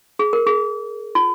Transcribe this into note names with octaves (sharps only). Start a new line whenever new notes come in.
G#4
A#4
G#4
F4